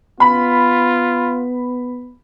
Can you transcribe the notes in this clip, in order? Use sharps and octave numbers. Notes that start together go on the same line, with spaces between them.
B3 F4 B5